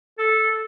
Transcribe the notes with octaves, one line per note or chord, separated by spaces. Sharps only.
A4